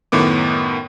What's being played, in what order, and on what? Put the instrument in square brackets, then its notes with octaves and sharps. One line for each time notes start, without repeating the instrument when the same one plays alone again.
[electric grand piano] F#2 A2 D#3 B3 D6